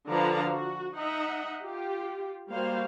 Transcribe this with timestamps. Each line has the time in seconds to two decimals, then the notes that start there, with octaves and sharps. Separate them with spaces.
0.10 D3 F3 B4 F5 A5 A#5
0.50 F#4
0.95 D#4 D#5 E5 F#5
1.62 F4 G4
2.51 G3 A#3 F#4 C5 F5